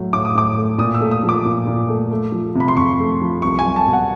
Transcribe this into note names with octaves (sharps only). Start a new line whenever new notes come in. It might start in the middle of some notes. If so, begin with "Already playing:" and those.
Already playing: A2 F#3 A3
A2 D6
D#6
A2 D6
A3
A#2 D#6
E6
A3
D#6
F3
D6
A#2
A#2
A3
A3
F3
C3 B5
C6
F2 C#6
A3
F3
C2 C#6
G#5
G3
A5
B2
F#5